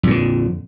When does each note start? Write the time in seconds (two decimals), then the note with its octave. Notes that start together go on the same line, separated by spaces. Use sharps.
0.03 F2
0.07 A#2
0.11 D3